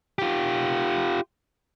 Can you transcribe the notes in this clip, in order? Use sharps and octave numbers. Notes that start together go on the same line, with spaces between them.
F4 G4